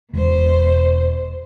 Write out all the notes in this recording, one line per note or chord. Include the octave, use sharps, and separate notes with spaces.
E1 B2 C5